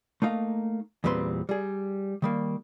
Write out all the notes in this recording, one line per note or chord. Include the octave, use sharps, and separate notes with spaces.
A3 A#3 D#4 F5
E2 A#2 G3 C4 B4 C6
G3 G#4
D#3 G3 A#3